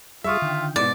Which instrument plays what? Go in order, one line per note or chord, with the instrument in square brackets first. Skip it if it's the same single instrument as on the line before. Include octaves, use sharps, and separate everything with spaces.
[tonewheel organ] G3 G#4 [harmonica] F4 [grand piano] E5 C#6 D#6
[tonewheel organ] D3 D#3 G5
[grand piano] G#2 B2 [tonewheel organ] E4 [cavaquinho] D5